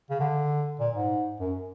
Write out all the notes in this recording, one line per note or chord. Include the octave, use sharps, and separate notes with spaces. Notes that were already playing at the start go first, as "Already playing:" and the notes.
C#3
D3
A#2
G#2
F#2